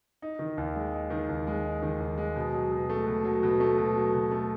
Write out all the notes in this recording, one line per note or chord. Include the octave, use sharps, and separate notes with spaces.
D#4
D#3
D#2
G#3
D#4
D#3
D#2
G#3
D#4
D#3
D#2
G#3
B2
F#3
B2
A3
B2
F#3
B2
A3
B2
F#3
B2
A3